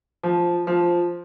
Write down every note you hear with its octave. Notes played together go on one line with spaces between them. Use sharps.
F3
F3